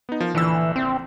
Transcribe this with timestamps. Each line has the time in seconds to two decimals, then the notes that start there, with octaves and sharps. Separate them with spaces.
0.09 B3 D#4
0.20 F3 A#4
0.35 A#1 D3 E3 E6
0.76 C4